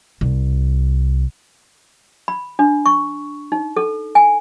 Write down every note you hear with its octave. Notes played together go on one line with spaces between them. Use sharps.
C2
B5
D4
C#6
D#4
A4
G#5